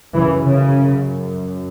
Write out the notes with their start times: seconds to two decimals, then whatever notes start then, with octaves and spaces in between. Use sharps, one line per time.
0.15 F#2 C#3 E3
0.44 C#3